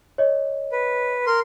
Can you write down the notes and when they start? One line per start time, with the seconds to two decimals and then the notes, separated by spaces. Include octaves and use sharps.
0.18 C#5 D#5
0.72 B4
1.26 A#4 C6